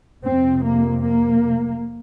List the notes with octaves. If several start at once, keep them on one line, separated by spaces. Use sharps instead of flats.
F2 C3 C4
A#3
A#3